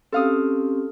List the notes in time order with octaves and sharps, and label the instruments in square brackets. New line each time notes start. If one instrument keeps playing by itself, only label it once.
[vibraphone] C4 C#4 G4 [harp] A4 F5 D#6